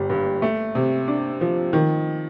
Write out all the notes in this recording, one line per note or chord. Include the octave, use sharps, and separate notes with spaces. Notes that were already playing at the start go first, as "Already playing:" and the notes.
Already playing: G1 G3
G2
A3
C3
D4
F3
D#3